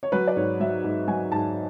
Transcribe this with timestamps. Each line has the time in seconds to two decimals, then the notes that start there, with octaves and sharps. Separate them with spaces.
0.03 C#5
0.12 F#3 B4
0.27 D5
0.36 G#2 C#5
0.60 F#3 E5
0.84 G#2
1.08 F#3 G#5
1.31 G#2 A5